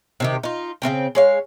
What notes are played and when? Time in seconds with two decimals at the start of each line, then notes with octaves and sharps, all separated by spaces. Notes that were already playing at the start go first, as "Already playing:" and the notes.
0.20 C3 D#3 G4
0.43 D#4 F4
0.82 C#3 A#3 C4 G5
1.15 G#3 C#5 F5